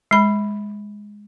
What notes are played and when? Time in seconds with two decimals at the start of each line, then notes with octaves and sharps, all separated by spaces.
0.11 G#3 B5